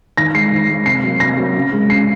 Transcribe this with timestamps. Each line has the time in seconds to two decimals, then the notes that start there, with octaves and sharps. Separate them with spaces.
0.17 D#3 A#6
0.34 G#3 C7
0.52 D#3
0.68 G#3
0.85 C3 C7
1.03 F#3 A#3
1.20 C3 A#6
1.37 F#3 A#3
1.55 C#3
1.72 G#3
1.90 C#3 C7